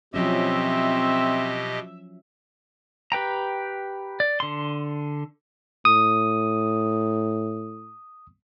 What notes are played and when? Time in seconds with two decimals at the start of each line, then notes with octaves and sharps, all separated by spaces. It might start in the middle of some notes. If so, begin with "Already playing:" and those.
0.14 B2 F3 F#3 C4 C#4 G4 D#5 E5
3.12 G4 B4 G5 A#5
4.20 D5
4.40 D3 C6
5.85 A2 D#6